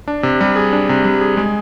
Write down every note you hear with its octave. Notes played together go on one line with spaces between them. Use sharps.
D4
C3
G3
G#4
D4
C3
G3
G#4
G#3